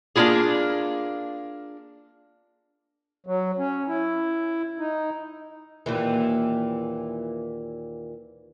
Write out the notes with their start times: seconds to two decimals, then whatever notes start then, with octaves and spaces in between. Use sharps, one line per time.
0.16 A#3 D4 E4 F4 G#4
3.27 F#3
3.58 C#4
3.88 E4
4.79 D#4
5.86 D#2 A#2 E3